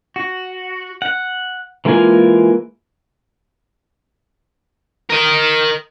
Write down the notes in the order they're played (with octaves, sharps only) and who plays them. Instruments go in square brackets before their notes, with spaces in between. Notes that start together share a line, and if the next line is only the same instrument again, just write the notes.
[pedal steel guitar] F#4
F#5
E3 G#3 A#3 F4 G#5
[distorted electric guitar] A#4 D#5